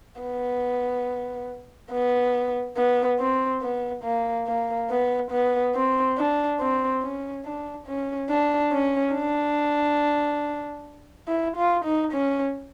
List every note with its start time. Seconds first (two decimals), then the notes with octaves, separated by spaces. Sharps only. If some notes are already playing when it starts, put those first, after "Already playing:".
0.22 B3
1.92 B3
2.77 B3
3.19 C4
3.62 B3
4.04 A#3
4.47 A#3
4.90 B3
5.32 B3
5.75 C4
6.18 D4
6.60 C4
7.03 C#4
7.45 D4
7.87 C#4
8.30 D4
8.72 C#4
9.14 D4
11.28 E4
11.56 F4
11.85 D#4
12.12 C#4